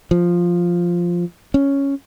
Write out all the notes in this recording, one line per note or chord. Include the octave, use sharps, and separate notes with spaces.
F3
C#4